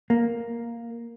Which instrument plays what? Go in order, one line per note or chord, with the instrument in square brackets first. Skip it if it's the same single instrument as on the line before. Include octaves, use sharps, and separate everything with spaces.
[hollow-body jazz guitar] A#3